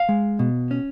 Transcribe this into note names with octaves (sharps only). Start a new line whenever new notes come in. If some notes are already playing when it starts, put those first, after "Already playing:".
Already playing: F5
G#3
B2
C#4